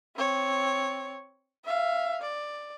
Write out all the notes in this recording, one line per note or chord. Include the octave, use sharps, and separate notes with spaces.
C4 C#5
E5 F5
D5